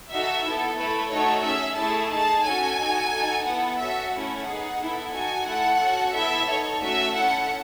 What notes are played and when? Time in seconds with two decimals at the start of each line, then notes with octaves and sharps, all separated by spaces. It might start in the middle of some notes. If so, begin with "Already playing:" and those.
0.10 D#4 F#4 A4 E5
0.44 B3 E4 A4
0.77 A3 E4 A4 B4
1.11 A3 D#4 F#4 A4 C#5
1.44 C#4 G#4 E5
1.77 A3 E4 G#4 A5
2.11 D#4 G#4 A5
2.45 C#4 F#4 A4 G#5
2.78 D#4 F#4 A4
3.11 D#4 F#4 A4
3.45 B3 E4 A4 F#5
3.79 C#4 F#4 A4 E5
4.12 A3 C#4 E4 F#5
4.46 B3 D#4 G#4
4.80 B3 E4 A4
5.13 D#4 F#4 A4 G#5
5.46 A3 E4 A4 F#5
5.80 C#4 F#4 A4
6.14 B3 E4 A4 E5
6.47 D#4 A4 C#5
6.81 A3 C#4 F#4 A4 E5
7.14 C#4 E4 A4 F#5